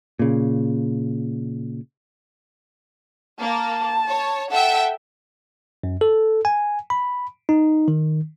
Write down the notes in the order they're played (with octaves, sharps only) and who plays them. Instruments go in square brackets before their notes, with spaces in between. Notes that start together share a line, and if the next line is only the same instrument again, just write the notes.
[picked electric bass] A#2 C#3
[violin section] A#3 [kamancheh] A5
[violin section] C#5
[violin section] A4 E5 G5 [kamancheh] F#5
[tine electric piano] F#2
A4
G#5
B5
D#4
D#3